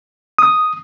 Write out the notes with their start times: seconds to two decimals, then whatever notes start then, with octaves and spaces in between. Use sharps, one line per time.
0.39 D#6